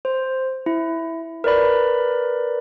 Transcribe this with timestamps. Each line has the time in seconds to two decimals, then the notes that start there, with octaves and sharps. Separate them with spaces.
0.05 C5
0.66 E4
1.44 A#4 B4 D5 B5